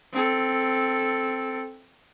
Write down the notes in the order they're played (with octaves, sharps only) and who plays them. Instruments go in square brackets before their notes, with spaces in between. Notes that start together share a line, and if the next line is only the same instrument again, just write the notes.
[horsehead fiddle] C4 A4